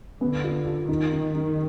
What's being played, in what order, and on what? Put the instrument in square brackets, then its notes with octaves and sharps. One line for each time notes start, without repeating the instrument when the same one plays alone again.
[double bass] D3 [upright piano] B3
[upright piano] F4
F4
[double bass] D#3 [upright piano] D#4
[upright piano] D#4
D#4